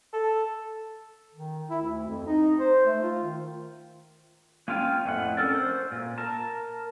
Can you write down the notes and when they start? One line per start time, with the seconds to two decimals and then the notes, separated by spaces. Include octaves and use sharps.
0.13 A4
1.34 D#3
1.70 E4
1.82 D2
2.07 F2
2.27 D#4
2.60 C5
2.86 A3
3.02 F4
3.23 D#3
4.68 A#3 C#4 F4 F5 G5 G#5
5.05 F2 A2 F#5
5.37 C#4 A4 A#4 D5
5.55 C5
5.91 A#2
6.18 A#4 A5